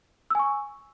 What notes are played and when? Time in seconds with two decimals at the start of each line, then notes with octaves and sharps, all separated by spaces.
0.30 E6
0.35 G#5
0.39 C#6